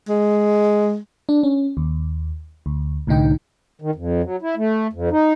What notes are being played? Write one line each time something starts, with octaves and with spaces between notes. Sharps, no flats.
G#3
D4
C#4
D#2
D2
C2 A2 D3 D#4 G5
D#3
F2
F#3
E4
A3
F2
D#4